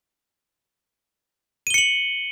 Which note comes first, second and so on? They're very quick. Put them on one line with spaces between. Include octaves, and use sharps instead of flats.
D#7 G7 C#7 F#7